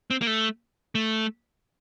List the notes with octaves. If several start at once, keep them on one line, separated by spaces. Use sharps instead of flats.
C4
A#3
A3
A3